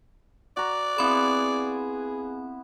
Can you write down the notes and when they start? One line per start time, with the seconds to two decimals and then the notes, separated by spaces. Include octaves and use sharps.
0.57 F#4 D5 A#5
0.98 B3 C4 E4 G#4 B5 C6